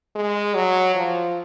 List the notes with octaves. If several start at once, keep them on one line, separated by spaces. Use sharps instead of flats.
G#3
F#3
F3